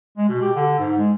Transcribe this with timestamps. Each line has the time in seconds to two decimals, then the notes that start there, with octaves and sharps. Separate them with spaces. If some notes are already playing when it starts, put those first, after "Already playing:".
0.17 G#3
0.29 B2
0.42 G4
0.55 D3
0.79 G#2
0.98 G#3